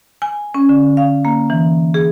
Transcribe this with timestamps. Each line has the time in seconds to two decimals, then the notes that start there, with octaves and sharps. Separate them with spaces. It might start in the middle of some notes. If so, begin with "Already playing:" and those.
0.22 G#5
0.54 C#4
0.69 D3
0.97 F5
1.25 A#3
1.50 E3
1.94 G#4